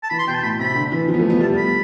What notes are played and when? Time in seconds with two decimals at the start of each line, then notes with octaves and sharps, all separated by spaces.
0.04 A5
0.10 E3 B5
0.19 C6
0.27 B2 G5
0.35 A5
0.43 A2 B5
0.60 C3 B5
0.75 D3
0.92 E3
1.08 F3
1.14 B3
1.19 A3
1.30 B3
1.41 G3 A5
1.57 B5